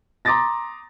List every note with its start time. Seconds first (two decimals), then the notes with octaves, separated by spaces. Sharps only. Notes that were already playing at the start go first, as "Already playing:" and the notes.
0.25 A#5 C6 D6 D#6 A6 A#6